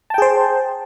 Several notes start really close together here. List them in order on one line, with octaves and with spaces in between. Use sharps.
A5 G5 G#4 C5